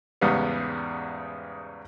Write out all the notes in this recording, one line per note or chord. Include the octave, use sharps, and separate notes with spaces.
E2 G#2 C#3 G3 B3